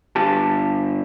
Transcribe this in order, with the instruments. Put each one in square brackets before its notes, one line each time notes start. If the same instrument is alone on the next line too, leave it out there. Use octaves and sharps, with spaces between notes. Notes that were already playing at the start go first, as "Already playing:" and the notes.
[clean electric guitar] G2 D3 G4 A5